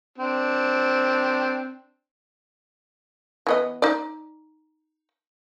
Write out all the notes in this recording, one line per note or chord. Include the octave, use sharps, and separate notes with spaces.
C4 D4
E3 B3 D#5
D#4 D5